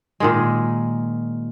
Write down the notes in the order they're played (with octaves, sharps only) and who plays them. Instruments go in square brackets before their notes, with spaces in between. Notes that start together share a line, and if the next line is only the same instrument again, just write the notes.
[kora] A#2 D#3 G#3